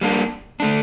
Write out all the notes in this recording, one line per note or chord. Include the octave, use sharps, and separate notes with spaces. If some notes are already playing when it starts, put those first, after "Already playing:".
G3 A#3 D4
D3 A3 D4